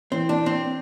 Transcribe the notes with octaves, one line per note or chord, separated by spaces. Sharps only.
E3 C4
D4
C4